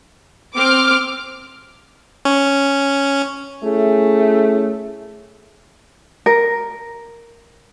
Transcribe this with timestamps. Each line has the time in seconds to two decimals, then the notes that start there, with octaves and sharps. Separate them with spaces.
0.55 C4 D6 F6
2.25 C#4
3.64 A3 C#4 E4 G#4
6.26 A#4